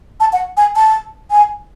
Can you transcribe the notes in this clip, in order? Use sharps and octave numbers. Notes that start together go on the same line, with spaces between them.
A5
F#5
G#5
A5
G#5